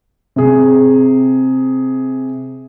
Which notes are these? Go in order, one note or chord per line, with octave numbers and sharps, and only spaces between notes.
C3 G#4